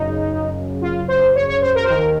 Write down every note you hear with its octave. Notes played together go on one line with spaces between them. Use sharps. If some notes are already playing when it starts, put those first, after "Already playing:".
Already playing: F#2 C#3 D#4
F4
C5
C#5
C#5
C5
A#4
C5
D#2 D#3 A#4